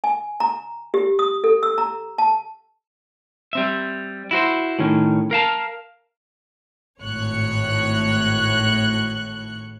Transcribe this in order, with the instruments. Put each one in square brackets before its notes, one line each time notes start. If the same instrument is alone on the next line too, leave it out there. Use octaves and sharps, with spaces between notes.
[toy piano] G#5
A#5
G4
D#6
A4
E6
A#5
A5
[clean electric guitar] G3 C4 E5
E4 F#4 C5
A2 D#3 C#4
A#4 F5 A5
[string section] G#1 A2 C#5 F#6 C#7